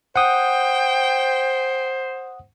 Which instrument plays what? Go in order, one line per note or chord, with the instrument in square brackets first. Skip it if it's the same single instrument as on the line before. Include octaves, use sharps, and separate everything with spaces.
[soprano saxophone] C5 [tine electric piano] F#5 D#6 [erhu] G5